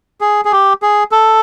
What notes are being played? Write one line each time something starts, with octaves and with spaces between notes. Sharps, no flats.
G#4
G#4
G4
G#4
A4